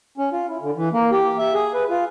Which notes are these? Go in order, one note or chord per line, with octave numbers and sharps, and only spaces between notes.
C#4
F4
E4
D3
E3
A#3
G4
E5
G#4
B4
F4